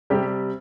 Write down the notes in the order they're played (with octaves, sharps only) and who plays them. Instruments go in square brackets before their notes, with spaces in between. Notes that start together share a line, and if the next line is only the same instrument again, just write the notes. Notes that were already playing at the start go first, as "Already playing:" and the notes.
[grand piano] C3 G3 G4